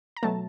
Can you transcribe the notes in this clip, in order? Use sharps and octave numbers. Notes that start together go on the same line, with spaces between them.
A#5
B2 F#3 A3 A5